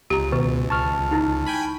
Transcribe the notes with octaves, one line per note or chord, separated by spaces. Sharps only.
C#2 G4 A#5
B2 D#3 B4
A5 C#6 F6
D#4 E4
G5 G#5 B5